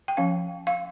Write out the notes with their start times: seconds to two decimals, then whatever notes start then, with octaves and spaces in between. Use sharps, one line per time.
0.08 G5
0.17 F3 C#4 F5
0.67 F5